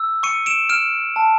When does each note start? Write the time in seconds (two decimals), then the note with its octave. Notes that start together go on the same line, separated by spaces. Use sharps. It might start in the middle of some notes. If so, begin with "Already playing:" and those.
Already playing: E6
0.23 C#6 C#7 D#7
0.46 D7 E7
0.69 F6 D7 E7
1.16 A5